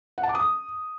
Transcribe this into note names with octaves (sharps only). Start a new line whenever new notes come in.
F#5
A5
D6
D#6